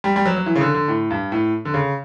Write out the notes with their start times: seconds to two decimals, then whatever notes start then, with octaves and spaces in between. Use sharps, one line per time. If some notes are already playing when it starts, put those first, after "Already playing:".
0.04 G3
0.16 G3
0.26 F#3
0.36 F#3
0.46 E3
0.55 C#3
0.61 D3
0.74 D3
0.88 A2
1.10 G2
1.32 A2
1.65 D3
1.74 C#3